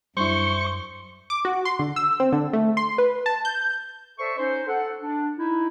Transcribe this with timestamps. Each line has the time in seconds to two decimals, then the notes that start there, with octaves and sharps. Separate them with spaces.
0.17 F#2 G3 D4 E4 C5 C#6
1.30 D6
1.45 F#4
1.65 C6
1.79 D3
1.96 E6
2.20 C4
2.32 D3
2.53 A3
2.77 C6
2.98 B4
3.26 A5
3.45 G6
4.19 A4 C5 D5 E5 C#6
4.37 C#4 D#4 C5
4.67 A4 F#5
5.01 D4
5.38 D#4 E4